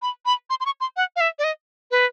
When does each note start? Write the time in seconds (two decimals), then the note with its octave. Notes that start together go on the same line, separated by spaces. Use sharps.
0.02 B5
0.26 B5
0.50 C6
0.61 C6
0.66 C#6
0.81 C6
0.97 F#5
1.16 F5
1.21 E5
1.39 D5
1.44 D#5
1.91 B4